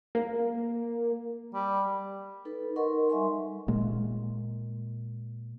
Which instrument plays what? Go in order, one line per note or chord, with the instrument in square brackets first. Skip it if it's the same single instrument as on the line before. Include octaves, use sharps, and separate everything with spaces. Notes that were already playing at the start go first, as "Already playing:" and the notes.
[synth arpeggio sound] A#3
[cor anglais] G3
[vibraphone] D#4 A4 B4
D#4 A#4 D#5 F#5 C6 C#6
G3 E5 G#5 C6
[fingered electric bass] A#2 G#3 A#3